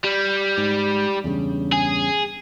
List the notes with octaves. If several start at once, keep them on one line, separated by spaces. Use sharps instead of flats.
G3
G#2
E2 G2 C#3
G#4